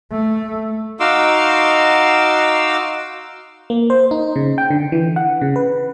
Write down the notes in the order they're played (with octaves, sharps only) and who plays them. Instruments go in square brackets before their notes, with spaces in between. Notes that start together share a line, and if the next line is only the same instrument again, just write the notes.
[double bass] A3
[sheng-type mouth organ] D#4 F#4 F5 C6 D6 E6
[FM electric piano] A#3
C5
D#4
C#3
G5
D3
E3
F#5
C#3
B4